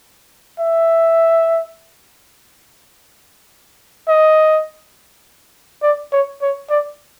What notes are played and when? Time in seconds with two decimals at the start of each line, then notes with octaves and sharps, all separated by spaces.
0.59 E5
4.08 D#5
5.82 D5
6.12 C#5
6.42 C#5
6.70 D5